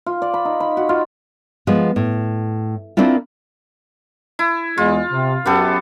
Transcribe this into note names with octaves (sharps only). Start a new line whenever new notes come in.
F4
D5
B5
D#4
B5
F#4
F4
F3 G#3 B3 F4
A2
A#3 C4 D4 E4 F4
E4
E2 G#3 F4
C3
F#2 B3 G4 A4